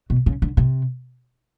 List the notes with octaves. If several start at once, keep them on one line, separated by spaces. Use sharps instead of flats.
B2
C#3
D3
C3